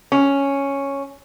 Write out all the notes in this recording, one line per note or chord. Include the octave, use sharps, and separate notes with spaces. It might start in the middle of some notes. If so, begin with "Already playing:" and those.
C#4